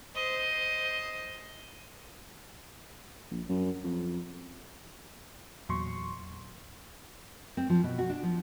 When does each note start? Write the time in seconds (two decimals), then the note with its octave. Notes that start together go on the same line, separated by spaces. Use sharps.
0.15 C5 D#5
3.31 A#1
3.49 F#2
3.84 F2
5.69 E2 A#2 F#3 C6 C#6
7.57 C4
7.70 F3
7.83 B2
7.99 F#4
8.10 D4
8.23 F3